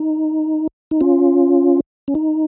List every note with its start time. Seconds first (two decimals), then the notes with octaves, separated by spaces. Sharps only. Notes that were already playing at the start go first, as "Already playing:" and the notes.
Already playing: D#4
0.91 D#4
1.01 C#4 F4
2.08 C#4
2.15 D#4